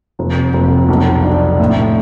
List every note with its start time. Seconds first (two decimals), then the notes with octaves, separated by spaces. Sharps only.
0.19 F1
0.54 F1
0.88 B1
1.24 D4
1.59 A2